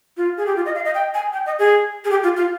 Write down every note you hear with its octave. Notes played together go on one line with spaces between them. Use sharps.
F4
G#4
G4
F4
D#5
F5
D#5
G5
G#5
G5
D#5
G#4
G#4
G4
F4
F4